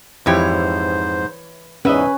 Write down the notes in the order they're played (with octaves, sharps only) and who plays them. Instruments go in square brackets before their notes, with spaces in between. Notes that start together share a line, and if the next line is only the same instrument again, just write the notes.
[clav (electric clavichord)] F2 E4 G4 [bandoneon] G#2 C5 [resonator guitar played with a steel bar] E3 C#5
[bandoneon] E2 G#2 [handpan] C#4 [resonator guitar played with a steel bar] B4 [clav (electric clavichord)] D#5 E5 F#5